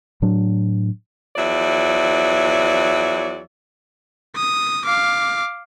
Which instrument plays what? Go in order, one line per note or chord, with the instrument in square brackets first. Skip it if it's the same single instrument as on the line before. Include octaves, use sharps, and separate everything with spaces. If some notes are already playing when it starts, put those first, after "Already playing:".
[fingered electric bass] A2 F#3 D4
[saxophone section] E2 F3 F#3 D5 E5
[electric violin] D#6
F5 D6